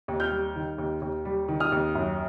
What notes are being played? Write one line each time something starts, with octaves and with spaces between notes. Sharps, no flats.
D#2
F6 G6
G3
D#3
D#2
D#2
G3
D#3
D#6 F6
D#2
F#2